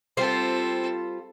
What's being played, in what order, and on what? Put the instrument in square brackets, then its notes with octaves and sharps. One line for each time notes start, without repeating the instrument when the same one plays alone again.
[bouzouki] G3 F4 C5 [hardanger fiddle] C4 A4